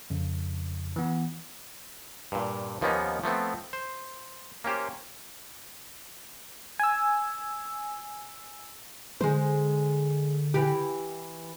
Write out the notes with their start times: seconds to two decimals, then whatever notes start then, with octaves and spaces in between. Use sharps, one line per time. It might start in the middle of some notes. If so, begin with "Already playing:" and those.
0.10 F2 C#3
0.96 E3 B3
2.32 G2 A#2
2.81 D#2 F3 A#3 B3 C#4 D#4
3.24 F3 A3 B3 C4
3.73 C5
4.64 A#3 C#4 G4 C5
6.79 G#5 E6
9.21 D3 G#3 C5
10.54 E3 G4